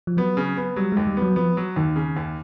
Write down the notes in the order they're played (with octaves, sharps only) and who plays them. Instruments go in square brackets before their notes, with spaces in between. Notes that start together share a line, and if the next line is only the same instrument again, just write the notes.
[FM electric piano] F3
[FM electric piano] F#3 [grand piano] B3
[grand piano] C#3
B3
[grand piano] F#3 [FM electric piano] G3
[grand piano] D#2 [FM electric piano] G#3
[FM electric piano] G3
[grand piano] B3
[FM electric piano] F#3
[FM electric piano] F3 [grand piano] B3
[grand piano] F#3
[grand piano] D#2 [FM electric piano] D#3
[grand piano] C#3
D#2